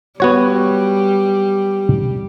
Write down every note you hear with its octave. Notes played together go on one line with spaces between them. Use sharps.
G3 B3 F#4 C#5